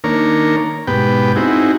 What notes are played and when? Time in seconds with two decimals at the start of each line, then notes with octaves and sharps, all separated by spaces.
0.04 D#3 A#3 D4 A#4 C#5
0.87 G#2 B2 B3 G4 B4 G5
1.36 C4 D#4 E4 F#4 G#4